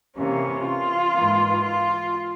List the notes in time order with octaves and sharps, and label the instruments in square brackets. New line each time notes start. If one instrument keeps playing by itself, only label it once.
[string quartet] C3 E3 A#3 C#4
F4
G#2 E3 A#3
F4